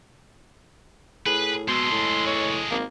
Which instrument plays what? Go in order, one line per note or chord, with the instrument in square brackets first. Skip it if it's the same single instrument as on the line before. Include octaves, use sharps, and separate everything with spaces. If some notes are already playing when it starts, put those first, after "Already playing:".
[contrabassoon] A2 [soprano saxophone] G#4 [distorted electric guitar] B4
[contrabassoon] B2 [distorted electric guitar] G#3 A4 [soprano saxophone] C6
[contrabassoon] A2
[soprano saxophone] C#5
[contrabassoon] G#1 [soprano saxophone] A#3